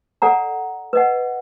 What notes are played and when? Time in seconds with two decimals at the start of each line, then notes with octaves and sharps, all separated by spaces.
0.22 A4 D5 F#5 A#5
0.93 B4 D#5 F#5